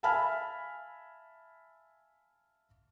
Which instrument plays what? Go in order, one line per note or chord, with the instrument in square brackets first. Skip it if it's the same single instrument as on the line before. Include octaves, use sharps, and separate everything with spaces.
[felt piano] E5 F5 G#5 A5 B5 F6